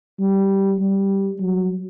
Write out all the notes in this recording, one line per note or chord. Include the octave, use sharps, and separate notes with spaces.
G3
G3
F#3